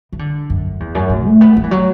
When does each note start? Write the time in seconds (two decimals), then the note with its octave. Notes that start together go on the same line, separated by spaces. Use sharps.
0.12 E3
0.19 D3
0.50 F#2
0.80 E2
0.95 F#2
1.10 A2
1.25 A3
1.41 B3
1.57 A3
1.64 E3
1.71 F#3